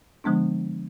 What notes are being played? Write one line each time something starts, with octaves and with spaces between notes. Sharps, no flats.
D3 F3 G#3 B3 D4